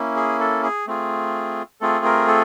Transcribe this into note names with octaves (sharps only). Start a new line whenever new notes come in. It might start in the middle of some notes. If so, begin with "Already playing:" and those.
Already playing: A#3 C#4 E4
G#4
A4
G#4
A3 C4 F4 G#4
A3 C4 F4 G#4 A4
A#4
A4